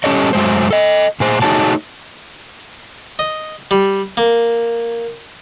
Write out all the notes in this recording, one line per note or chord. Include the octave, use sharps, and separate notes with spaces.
G3 C#4 G4 A4 C#5 D#5
F#2 F#3 G#3 A3 C5
A4 D#5
A#2 G#4 C5
A3 D#4 F#4 G#4 C#5 A5
D#5
G3
A#3